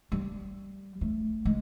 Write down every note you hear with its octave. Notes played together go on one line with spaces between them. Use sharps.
G3
A3
G#3